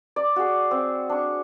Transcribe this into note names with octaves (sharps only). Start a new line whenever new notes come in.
D5
F#4 G#4
C4
D4 C#6